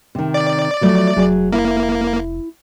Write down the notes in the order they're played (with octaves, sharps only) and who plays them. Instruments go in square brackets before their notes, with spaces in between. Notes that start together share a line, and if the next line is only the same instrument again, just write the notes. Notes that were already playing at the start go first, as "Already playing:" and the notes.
[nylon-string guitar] C3 D#3
[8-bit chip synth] D5
[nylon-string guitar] F3 F#3 A3
[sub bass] F1 [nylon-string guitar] F#3 G#4
[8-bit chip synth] A#3 [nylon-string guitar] E4 E5